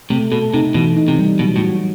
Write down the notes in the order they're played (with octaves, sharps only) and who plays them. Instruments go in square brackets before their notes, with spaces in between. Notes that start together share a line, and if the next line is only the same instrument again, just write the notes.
[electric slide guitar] C3 [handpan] A3
[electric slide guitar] B2 [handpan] A4
[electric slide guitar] C3 [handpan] D#4
[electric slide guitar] B2 [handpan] E3
[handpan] D#4
[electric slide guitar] C3
[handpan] G3
[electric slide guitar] B2 [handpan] F#3
[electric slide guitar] A2
[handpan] F#4